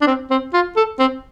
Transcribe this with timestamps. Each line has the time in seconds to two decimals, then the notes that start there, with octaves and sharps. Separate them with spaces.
0.02 D4
0.07 C4
0.30 C4
0.54 F4
0.76 A4
0.99 C4